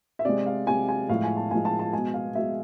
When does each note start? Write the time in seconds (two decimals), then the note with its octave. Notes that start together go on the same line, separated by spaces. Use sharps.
0.19 E5
0.25 C3 G#3 D5
0.46 F5
0.67 C3 G#3 G#5
0.89 G#5
1.09 A2 F3 G#3 F5
1.24 G#5
1.37 A5
1.51 A2 F3 G#3 G#5
1.65 A5
1.79 A5
1.93 B2 G#3 G#5
2.14 F5
2.35 B2 G#3 E5